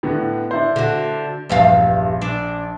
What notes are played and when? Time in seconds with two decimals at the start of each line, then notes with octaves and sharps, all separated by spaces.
0.03 A2 D3 B3
0.51 D4 E4 C5
0.76 D3 F#4
1.49 A#1 E2 G2 F5
2.22 D4